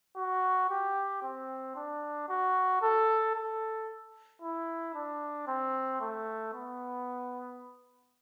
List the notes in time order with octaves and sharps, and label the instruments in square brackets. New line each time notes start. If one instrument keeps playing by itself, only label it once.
[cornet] F#4
G4
C4
D4
F#4
A4
A4
E4
D4
C4
A3
B3